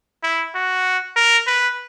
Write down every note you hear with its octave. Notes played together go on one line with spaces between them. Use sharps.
E4
F#4
A#4
B4